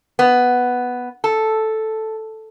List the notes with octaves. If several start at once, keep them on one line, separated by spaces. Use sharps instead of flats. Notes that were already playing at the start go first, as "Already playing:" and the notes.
B3
A4